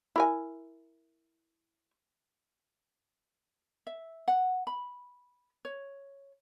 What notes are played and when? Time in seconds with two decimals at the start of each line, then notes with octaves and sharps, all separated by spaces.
0.16 E4 A#4 G#5
3.87 E5
4.28 F#5
4.67 B5
5.65 C#5